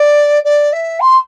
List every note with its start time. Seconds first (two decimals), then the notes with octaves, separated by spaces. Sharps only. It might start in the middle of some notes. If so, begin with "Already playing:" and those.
Already playing: D5
0.44 D5
0.72 E5
1.00 C6